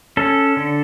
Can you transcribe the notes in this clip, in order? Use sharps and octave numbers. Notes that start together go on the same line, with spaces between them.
C#4 A4
D3